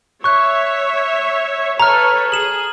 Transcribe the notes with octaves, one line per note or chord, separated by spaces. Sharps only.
C#5 E5 C#6 F#6
A4 B4 C#5 A#5 F6
G#4 E7 F#7